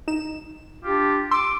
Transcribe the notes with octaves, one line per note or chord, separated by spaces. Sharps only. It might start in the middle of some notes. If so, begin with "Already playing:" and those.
D#4 E7
D4 F4 G4
C6 D6 E6